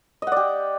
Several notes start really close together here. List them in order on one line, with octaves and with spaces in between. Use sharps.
D#5 F#5 D5 G4